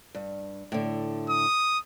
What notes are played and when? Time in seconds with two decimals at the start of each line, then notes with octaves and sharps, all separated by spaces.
0.15 G2
0.72 A2 D3
1.30 D#6